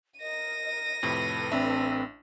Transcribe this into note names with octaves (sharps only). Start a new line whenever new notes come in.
A#4 D#5 A#6 D#7
F2 A2 C3 A4 B4 B5
A1 C4 D4 E5